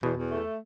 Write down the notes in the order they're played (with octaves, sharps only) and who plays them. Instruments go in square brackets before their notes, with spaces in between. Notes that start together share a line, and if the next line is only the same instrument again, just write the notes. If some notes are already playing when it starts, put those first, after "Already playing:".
[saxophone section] E2 [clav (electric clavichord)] B2
[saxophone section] E2
A3